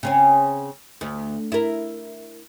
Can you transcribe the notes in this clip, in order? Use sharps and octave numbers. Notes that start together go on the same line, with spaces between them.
C#3 C4 C#4
D2
E4 A#4